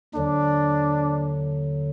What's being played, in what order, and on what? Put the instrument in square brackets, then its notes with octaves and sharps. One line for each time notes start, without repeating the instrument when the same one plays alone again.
[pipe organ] D#2 D3 F#3 [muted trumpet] D4